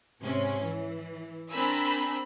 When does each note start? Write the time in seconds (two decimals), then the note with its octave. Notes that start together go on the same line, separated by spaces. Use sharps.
0.22 G#2 C3 C#4
0.63 E3
1.51 C4 D4 A#4 G#5 B5 E6